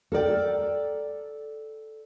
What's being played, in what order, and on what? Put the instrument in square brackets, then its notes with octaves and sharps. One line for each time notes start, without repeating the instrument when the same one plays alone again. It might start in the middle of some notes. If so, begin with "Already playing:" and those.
[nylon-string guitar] A4 A#4 D5 G5